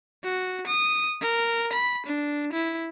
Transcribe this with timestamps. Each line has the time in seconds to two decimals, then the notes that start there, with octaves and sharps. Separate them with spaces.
0.24 F#4
0.67 D#6
1.21 A#4
1.73 B5
2.06 D4
2.53 E4